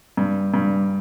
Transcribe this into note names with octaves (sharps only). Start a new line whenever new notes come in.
G2
G2